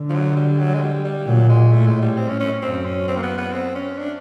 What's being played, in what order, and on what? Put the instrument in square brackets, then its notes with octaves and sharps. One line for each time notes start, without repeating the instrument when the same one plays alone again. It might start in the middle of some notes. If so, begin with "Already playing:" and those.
Already playing: [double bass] D3
[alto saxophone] F3
F#3
G3
F#3
G#3
G3
G3
[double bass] A#2 [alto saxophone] F#3
[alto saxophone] G#3
[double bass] A2 [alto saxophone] A3
[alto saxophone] G#3
G3
C4
C#4
C#4
[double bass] F#2 [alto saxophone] C4
[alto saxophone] C#4
C4
A#3
B3
B3
C4
C#4
D4